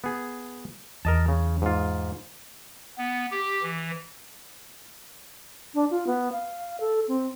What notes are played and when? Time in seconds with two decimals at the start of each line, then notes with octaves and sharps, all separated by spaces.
0.04 B3 G#4
1.05 E2 A#4 D#5 A5
1.28 C#3
1.62 G#2 F4
2.98 B3
3.31 G4
3.63 E3
5.74 D4
5.91 F4
6.07 B3
6.32 F5
6.80 A4
7.08 C4